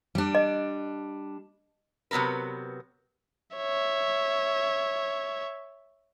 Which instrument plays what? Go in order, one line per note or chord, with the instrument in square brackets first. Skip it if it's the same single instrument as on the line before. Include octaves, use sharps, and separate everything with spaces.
[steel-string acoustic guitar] G3 D4
[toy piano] D#5
[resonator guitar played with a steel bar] C3 F#3 B3 A#4 B4
[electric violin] C#5 E5